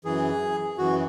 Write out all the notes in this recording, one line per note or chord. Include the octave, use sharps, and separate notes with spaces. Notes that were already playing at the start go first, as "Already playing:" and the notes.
F#2 E3 G#4
F#2 E3 F#4